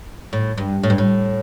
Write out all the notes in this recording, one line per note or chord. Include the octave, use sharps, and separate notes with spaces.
A2
G2
A2
G2
A2